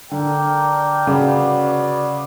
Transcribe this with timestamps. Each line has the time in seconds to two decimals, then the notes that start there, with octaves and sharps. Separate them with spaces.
0.11 D3 D4 A#4 D5 G5
1.07 C#3 F#4 B4 D5